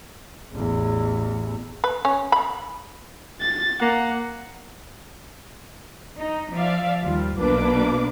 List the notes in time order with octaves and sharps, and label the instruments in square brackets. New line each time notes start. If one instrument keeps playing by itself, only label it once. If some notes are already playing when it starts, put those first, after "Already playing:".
[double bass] A1 E2
[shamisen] B4
C#4
B5
[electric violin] A6
[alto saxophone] A#3 [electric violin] F#5
[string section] D#4
F3 D5 E5 F5
D#2 F3 G3 F4
B1 B2 A#3 D4 B4 D6